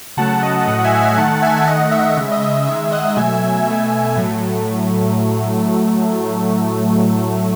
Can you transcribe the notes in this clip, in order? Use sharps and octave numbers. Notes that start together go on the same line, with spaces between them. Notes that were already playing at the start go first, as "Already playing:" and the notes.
C#3 F#3 A3 F#5 A5
D#5
A2 F#3 A3 D#5 F#5
F#5
E5 G#5
E5 G#5
D#3 A3 F#5 A5
E5 G#5
E5
D#3 A3 D#5 F#5
E5
F#5
C#3 G#3 E5
D#5
E5
D#3 G#3 E5
D#5 F#5
F#5
B2 F#3 A3 E5 G#5
B2 A3
A2 F#3 A3